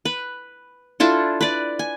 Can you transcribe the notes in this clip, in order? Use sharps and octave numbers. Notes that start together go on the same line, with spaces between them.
B4
D4 E4 F4 A4
B4 D5
G#5